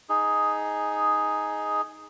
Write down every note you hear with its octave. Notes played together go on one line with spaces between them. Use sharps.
D#4 G#4